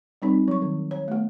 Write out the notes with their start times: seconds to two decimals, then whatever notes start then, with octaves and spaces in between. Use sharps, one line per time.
0.22 G3 C4 D#4
0.48 F#3 C#6
0.62 D#3
0.91 C#5
1.08 A3 B3